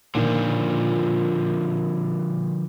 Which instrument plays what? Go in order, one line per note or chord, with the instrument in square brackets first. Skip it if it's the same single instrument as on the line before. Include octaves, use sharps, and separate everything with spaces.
[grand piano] A#2 D#3 [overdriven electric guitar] D3 F3